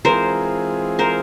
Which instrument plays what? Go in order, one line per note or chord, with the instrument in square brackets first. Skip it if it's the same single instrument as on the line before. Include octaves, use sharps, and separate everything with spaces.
[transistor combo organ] E3 G#3 C4 F4 G#4 [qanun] A#4 C5
[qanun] A#4 C5